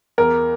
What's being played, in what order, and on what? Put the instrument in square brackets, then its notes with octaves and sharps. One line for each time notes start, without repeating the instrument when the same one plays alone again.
[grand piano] E2 A#4